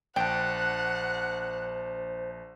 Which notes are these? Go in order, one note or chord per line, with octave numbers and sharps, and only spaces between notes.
A#1 C5 F#5 G5 A5